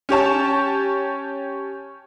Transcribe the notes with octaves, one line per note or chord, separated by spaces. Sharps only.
C#4 G4 C#5 A5